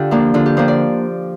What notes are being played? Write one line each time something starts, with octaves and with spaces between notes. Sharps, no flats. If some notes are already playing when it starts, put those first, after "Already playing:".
Already playing: D3 F4 G4
F3 A#3 D4
D3 F4
G4
F3 A#3 D4 C5
D5